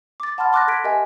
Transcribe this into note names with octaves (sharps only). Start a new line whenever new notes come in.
D6 A6
F#5 A5 B5 C6 F6 A6
C6 D6 F6 F#6 A6 A#6
A4 G#6 B6 D7
G4 A#4 D#5 E5 G#5